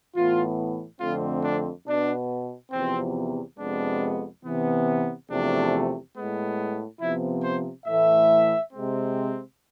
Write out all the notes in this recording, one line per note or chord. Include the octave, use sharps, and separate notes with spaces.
A2 E3 B3 F4
F2 D3 A3 C4 F4
D4
B2 B3 D4
E2 C3 F3 B3 C4
F2 C3 G#3 B3 D4
C3 E3 B3
E2 C3 F3 A3 D4
A2 G#3 B3
C3 F3 B3 E4
C5
A2 E3 A3 E5
C3 G#3 C4